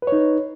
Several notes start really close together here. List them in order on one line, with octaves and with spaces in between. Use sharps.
B4 C#5 D#4